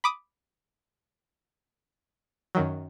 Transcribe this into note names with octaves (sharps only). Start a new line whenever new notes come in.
B5 D6 D#6
F#2 D#3 F#3